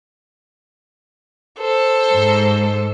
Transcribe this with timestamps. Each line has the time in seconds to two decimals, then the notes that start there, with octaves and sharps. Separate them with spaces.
1.59 A4 C5
2.13 G#2